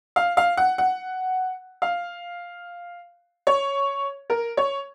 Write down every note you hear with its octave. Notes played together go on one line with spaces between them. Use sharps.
F5
F5
F#5
F#5
F5
C#5
A#4
C#5